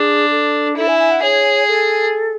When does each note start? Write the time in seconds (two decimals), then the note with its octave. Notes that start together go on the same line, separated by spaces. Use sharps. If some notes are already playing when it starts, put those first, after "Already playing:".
Already playing: D4 G#4
0.31 A4
0.77 E4 A4
0.88 G#5
0.99 G#5
1.11 F#5
1.22 G#4 C#5
1.68 A4